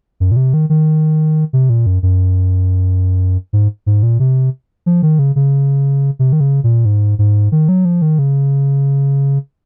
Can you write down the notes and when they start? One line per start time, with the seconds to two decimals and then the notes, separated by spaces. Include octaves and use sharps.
0.20 F#2
0.31 A#2
0.36 C3
0.54 D#3
0.70 D#3
1.53 C3
1.70 A#2
1.86 F#2
2.03 F#2
3.53 G#2
3.86 G#2
4.03 A#2
4.20 C3
4.86 F3
5.03 D#3
5.19 C#3
5.36 C#3
6.19 C3
6.33 D#3
6.40 C#3
6.64 A#2
6.85 G#2
7.19 G#2
7.52 D#3
7.69 F#3
7.85 F3
8.02 D#3
8.19 C#3